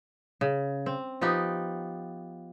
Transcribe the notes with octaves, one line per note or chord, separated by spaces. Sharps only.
C#3
C4
F3 B3 D#4 G4